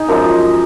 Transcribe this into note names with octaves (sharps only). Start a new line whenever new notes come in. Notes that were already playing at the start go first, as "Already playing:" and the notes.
Already playing: D#4 G#4
F#2 F3 G#3